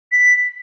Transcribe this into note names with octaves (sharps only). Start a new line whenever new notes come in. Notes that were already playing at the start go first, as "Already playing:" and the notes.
B6